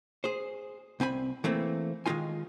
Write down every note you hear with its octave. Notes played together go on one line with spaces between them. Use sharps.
G#4 C5
C2 C4 G#5 B5
E3 A3 A#3 C4
D#3 G#3 A3 D#4 F4 G#5